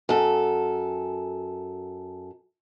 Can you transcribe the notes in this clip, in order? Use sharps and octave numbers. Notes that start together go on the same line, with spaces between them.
F#2 A4